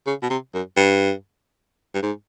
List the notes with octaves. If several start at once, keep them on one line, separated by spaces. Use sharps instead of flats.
C#3
B2
C3
F#2
G2
G2
G#2